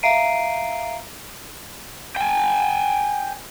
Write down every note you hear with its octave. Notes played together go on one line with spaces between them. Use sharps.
E5 F5 A#5 C7 D7 D#7
G5 G#5